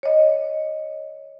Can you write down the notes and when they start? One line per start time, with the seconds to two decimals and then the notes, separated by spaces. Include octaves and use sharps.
0.03 C#5 D#5